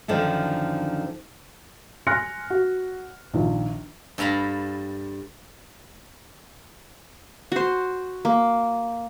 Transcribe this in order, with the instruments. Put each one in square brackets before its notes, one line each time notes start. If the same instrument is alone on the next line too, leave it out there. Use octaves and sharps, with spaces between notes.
[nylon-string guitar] F#2 D3 D#3 F3
[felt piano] G#5 C6 F6 F#6 A#6 C#7
F#4
A#1 D#3 F3
[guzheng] G2 A4 F5 A#5 B5
[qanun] F#4 C5
A#3